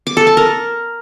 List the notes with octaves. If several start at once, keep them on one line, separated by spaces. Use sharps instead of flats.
D6
A4
A5
A#4